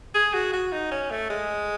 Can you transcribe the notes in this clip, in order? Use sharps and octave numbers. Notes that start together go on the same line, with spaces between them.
G#4
F#4
F#4
D#4
C#4
A3
G#3